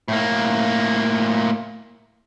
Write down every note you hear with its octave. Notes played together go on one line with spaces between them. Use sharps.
A2 A#3